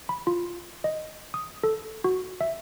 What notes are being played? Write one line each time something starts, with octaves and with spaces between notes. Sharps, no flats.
B5
F4
D#5
D#6
A4
F#4
E5